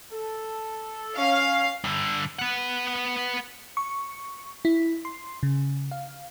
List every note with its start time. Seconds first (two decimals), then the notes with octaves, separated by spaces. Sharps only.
0.12 A4
1.18 C#4 F5
1.84 G2 D3
2.39 B3 F#5
3.77 C#6
4.65 E4
5.05 C6
5.43 C#3
5.91 F5